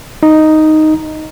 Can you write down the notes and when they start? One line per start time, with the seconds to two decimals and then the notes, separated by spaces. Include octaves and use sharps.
0.23 D#4